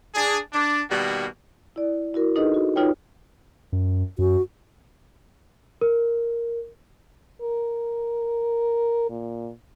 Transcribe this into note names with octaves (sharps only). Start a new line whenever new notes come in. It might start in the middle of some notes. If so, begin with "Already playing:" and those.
D4 G#4
D4
B2 D#3 G3 A#3 F#4
E4 D5
E4 F#4 A#4
D4 D#4 G#4 A4 B4 D#5
F#4
D#4 F4 B4 C#5 G5
F#2
F#2 F#4
A#4
A#4
A#2